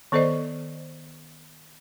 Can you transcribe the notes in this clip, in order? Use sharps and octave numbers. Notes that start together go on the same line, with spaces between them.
D#3 B3 A4 C5 D5 D#5